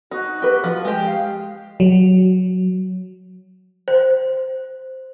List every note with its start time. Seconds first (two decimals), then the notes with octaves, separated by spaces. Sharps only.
0.11 D#4 F#4
0.42 G4 B4
0.64 F3
0.85 G#3 G4 G5
1.06 F5
1.80 F#3
3.88 C5